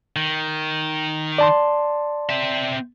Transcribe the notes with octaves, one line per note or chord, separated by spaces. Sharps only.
D#3
D5 A5 C6
C4 E5